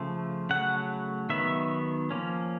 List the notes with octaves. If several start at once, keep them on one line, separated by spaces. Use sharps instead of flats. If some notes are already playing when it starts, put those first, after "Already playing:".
Already playing: C#3 F3 A3
C#3 F#3 A3 F#5
D#3 F#3 B3 E5
F3 A#3 C#4